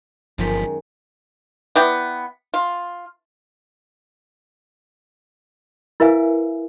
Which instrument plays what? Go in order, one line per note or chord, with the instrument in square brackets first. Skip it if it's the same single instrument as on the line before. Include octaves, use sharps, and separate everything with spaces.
[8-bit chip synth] G1 F3 B6 [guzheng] F#2 D#3 G#3
[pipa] B3 E4 D5 G5
F4
[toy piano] E4 A#4 B4 E5 F5 G#5